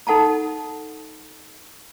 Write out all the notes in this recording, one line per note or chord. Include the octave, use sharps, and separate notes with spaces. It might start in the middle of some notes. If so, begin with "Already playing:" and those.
D#4 A4 F#5 A5 A#5